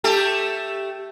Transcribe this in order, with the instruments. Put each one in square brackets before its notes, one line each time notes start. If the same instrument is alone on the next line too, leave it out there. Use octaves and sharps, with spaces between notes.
[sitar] A3 G4 A4